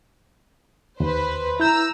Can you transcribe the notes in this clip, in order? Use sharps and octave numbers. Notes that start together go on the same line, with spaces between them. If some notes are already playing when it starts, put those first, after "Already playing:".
D#2 B4 C5
E4 A#5 E6 G6